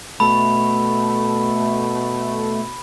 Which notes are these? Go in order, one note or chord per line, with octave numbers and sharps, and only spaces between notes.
B2 A3 B5